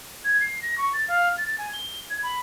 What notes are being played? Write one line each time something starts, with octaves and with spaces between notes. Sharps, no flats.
G#6
C7
A#6
C#6
A6
F5
A6
G#5
G7
G#6
B5